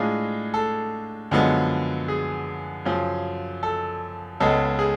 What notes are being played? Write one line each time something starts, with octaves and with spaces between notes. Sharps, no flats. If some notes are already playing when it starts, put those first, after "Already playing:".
Already playing: A2 G#3 D4 F4 G#4
A4
F#2 D3 F3 G#3 B3
G#4
F#2 C#3 F3
A4
C#2 C#3 G#3 B3 A4
G#4